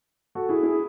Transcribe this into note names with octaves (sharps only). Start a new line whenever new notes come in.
F#4 A4
E4 G#4
E4 G#4